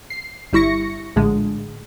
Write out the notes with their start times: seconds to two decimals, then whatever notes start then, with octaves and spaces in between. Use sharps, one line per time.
0.10 C7
0.53 G1 G3 E4 C#6 A#6 C#7
1.16 A#1 A2 D3 G#3